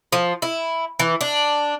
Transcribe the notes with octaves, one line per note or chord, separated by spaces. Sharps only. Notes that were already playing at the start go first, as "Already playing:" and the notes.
F3
E4
E3
D4